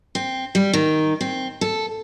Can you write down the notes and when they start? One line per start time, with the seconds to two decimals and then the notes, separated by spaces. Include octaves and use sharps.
0.15 C4
0.55 G3
0.73 D#3
1.21 C4
1.61 A4